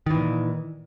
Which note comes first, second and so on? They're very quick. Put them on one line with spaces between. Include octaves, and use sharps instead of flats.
D#3 E3 A#2